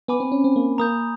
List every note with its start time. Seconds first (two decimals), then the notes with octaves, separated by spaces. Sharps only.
0.08 B3 G#5 B5 D6
0.20 C4
0.32 C#4
0.44 C4
0.56 A#3
0.78 A#3 A#5 D#6 G6